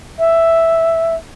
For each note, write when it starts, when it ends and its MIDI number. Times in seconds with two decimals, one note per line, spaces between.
0.19 1.14 76